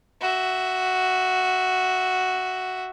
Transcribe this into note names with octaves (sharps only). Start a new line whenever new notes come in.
F#4 E5